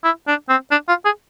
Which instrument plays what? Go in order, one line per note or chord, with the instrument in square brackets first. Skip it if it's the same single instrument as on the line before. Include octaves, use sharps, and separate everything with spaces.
[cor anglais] E4
D4
C4
D4
F4
G#4